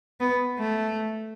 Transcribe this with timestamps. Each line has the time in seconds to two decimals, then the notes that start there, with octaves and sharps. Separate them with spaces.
0.20 B3
0.59 A3